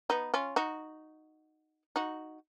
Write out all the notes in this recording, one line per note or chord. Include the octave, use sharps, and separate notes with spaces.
B3 D#4
C#4 F4
D#4 F#4
D#4 F#4